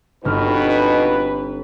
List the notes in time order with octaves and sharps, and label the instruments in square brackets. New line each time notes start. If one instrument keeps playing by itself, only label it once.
[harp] G1 C4 F6 [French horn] B2 [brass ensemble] D#4 F4 B4